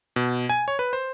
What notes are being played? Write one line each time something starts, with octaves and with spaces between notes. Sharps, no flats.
B2
G#5
C#5
B4
C5